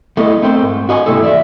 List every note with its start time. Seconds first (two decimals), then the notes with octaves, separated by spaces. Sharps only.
0.17 A3 B3 E4 G#4 D5 D#5
0.42 A3 C4 A#4 C5
0.63 G#2
0.89 F#4 D#5 F#5 G#5
1.06 C3 G#3 A#3 E4 A4
1.22 E2 D5 E5